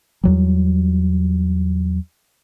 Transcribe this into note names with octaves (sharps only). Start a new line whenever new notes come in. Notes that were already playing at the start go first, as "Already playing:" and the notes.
E2 F#3 G3